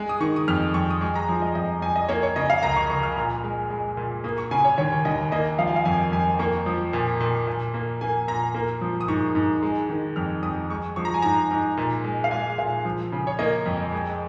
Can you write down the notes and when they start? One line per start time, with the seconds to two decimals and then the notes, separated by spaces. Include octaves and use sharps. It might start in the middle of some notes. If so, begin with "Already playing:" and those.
Already playing: G#3
0.09 D#6
0.20 D#3 C#6
0.36 D#6
0.48 F2 F6
0.74 F2 C#6
0.90 D#6
1.01 G#3 C#6
1.15 A#5
1.28 F3 G#5
1.42 D#5
1.55 F2 D#5
1.82 F2 G#5
1.96 D#5
2.08 A#3 C#5
2.23 C#5
2.36 C#3 D#5
2.50 F5
2.63 C#2 A#5
2.76 C#6
2.90 C#2 C#6
3.03 F6
3.17 A#2
3.43 G#3
3.70 G#3
3.97 A#2
4.24 A#3 D#6
4.38 C#6
4.51 C#3 G#5
4.64 C#5
4.78 D#2 C#5
5.05 D#2 D#5
5.32 A#3 D#5
5.58 F3 F5
5.67 G#5
5.76 F5
5.85 F2 G#5
6.12 F2 G#5
6.39 A#3 C#6
6.66 F3
6.93 A#2
7.20 A#2
7.47 A#2
7.74 A#3
8.01 A#3 G#5
8.28 A#2 A#5
8.54 A#3
8.81 F3
9.01 D#6
9.08 G#2 C#6
9.35 G#2
9.63 G#3
9.89 D#3
10.16 F2 F6
10.43 F2 D#6
10.70 G#3 C#6
10.96 F3 C#6
11.05 A#5
11.14 G#5
11.22 G#2 A#5
11.51 G#2
11.77 A#2
12.04 G#3
12.24 F5
12.31 G#3 G#5
12.58 A#2 F5
12.85 F3
13.12 C#3
13.27 C#5
13.39 A#3 D#5
13.66 F2
13.93 G#3